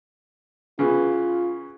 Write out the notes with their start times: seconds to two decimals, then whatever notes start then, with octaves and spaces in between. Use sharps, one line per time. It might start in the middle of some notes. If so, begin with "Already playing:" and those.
0.79 C#3 E3 B3 F4